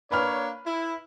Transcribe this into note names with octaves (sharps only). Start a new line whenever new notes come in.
A#3 D4 B4 C#5 B5 F6
E4